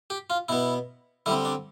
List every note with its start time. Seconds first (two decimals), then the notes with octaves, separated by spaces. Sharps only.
0.10 G4
0.30 F4
0.49 B2 B3 E4
1.26 D3 G3 C4 E4
1.45 D4